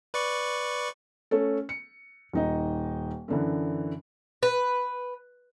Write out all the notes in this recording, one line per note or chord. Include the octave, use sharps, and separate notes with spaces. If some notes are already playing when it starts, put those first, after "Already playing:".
B4 D5 C#6
A3 C#4 A4
C#7
D#1 D#4 D#5
F#2 D3 E3
B4